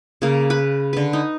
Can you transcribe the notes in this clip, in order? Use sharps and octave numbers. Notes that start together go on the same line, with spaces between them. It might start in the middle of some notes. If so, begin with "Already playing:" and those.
C#3 A#3
B4 B5
D3 B4
D#4